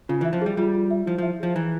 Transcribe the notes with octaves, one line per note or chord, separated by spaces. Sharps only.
C#3 F4
E3 E5
F3
G3 G#4
G3 F4
F4
E5
F3 E4
F3 E5
F3 G#4
E3 A#5